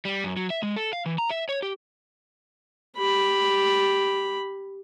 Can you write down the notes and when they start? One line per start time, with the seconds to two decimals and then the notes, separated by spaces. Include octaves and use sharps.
0.05 G3
0.24 F#2
0.37 F#3
0.50 E5
0.63 G#3
0.76 A4
0.93 F5
1.06 E3
1.18 A#5
1.30 E5
1.49 C#5
1.63 G4
2.97 G4 B5